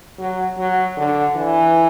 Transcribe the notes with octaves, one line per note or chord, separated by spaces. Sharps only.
F#3
F#3
D3
E3